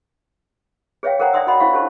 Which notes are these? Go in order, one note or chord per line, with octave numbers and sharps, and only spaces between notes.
G#4 B4 C#5 E5 F5 G5
G#4 A#4 C5 F#5 G5 A#5
D5 E5 G5 C6 D#6 E6
F#4 C#5 D#5 F#5 B5 C6
C#4 E4 C5 F5 C#6
D4 F4 G4 A4 C5 A5